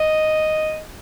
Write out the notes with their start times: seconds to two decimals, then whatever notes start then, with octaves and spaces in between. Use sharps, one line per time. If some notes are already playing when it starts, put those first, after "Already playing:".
Already playing: D#5